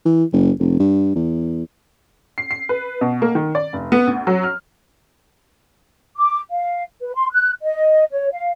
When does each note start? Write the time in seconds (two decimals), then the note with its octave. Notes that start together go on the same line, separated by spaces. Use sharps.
0.05 E3
0.33 F#1
0.59 F1
0.80 G2
1.16 E2
2.38 C7
2.51 C7
2.69 B4
3.01 B2
3.22 A#3
3.35 D#3
3.55 D5
3.73 F1
3.92 B3
4.07 D2
4.27 F#3
4.43 F6
6.16 D6
6.51 F5
7.01 B4
7.15 C6
7.32 F#6
7.62 D#5
8.10 C#5
8.32 F5